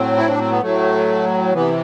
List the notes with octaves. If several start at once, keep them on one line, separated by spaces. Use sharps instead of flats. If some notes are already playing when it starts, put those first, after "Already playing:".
Already playing: A2 F#3 C4
E4
D4
C4
B3
A2 F#3 A3
C3 E3 B3